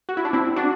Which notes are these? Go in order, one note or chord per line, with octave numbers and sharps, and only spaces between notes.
F#4
E4
D4
C4 E4
D4 F#4